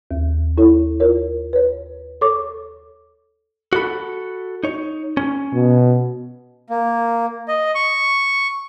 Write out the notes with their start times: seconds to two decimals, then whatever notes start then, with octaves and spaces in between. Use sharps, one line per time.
0.11 D#2
0.58 E4 A4 C#5
1.00 F4 A#4 C#5
1.53 B4 C#5
2.21 A4 C#5 C#6 D6
3.73 F#4 A4 B5
4.64 D#4 C#5
5.17 C#4
5.54 B2
6.70 A#3
7.48 D#5
7.75 C#6